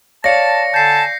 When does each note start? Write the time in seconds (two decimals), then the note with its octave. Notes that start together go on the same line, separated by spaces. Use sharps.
0.24 C#5 D5 F5 A5 A#6 C#7
0.74 D3 G#5 A5 G6 C7